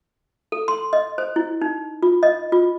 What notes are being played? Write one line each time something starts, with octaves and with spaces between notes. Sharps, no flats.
A4
C6
D#5
C5
E4
D#4
F4
D#5
F4